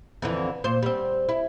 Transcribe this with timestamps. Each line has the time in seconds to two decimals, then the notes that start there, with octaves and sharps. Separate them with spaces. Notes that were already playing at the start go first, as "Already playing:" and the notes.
0.22 F2 D3 E3
0.64 A#2 C5
0.83 G3 C4
1.29 E4